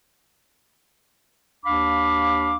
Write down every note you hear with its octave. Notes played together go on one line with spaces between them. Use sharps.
D#2 D4 F5 B5 D6